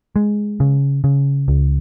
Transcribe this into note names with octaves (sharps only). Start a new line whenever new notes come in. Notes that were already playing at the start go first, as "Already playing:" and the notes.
G#3
C#3
C#3
C#2